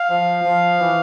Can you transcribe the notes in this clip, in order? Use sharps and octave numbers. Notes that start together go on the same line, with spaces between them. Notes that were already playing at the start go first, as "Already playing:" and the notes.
Already playing: F5
F3
F3
E3